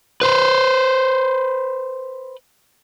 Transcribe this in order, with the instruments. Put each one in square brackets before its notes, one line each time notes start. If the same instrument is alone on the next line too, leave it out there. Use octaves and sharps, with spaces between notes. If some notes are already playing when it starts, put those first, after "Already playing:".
[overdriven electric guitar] B4 C5